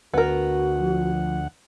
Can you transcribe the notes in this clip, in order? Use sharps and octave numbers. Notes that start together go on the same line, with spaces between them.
D2 B3 F#4 A#4 F#5
F3